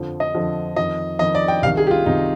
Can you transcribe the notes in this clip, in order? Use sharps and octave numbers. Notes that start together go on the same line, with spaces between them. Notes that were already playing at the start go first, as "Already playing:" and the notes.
Already playing: F2 D3 F3
D#5
F2 D3 F3
F2 D#3 D#5
F2 D#3 D#5
D5
G5
C2 C3 D#3 F5
G#4
G4
F4
C2 C3 D#3 D#4